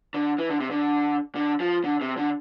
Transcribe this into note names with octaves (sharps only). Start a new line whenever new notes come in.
D3
E3
D3
C3
D3
D3
F3
D3
C3
D3